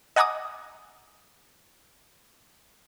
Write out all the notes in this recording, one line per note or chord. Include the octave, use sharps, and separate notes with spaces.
D#5 F#5 G#5 A#5 D6 D#6